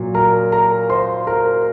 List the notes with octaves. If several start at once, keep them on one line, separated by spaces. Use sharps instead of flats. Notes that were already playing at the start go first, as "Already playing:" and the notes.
Already playing: A#2 F#3
A#4 A#5
A#4 A#5
C5 C6
A#4 A#5